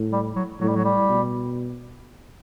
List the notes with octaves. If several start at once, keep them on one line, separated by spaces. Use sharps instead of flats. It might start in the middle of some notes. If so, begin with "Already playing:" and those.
Already playing: A2
G3
F#3
A2 F#3
G3
F#3
G3
B2